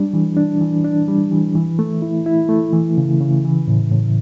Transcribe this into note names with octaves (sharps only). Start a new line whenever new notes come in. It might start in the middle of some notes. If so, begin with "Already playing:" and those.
Already playing: G3 D4
E3
D4
E3
D4
G3
E3
E3
A3
E4
E4
A3
E3
C#3
C#3
E3
A2
A2